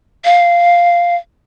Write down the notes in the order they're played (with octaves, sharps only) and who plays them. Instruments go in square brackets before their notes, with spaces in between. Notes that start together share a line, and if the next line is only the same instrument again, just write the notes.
[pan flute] F5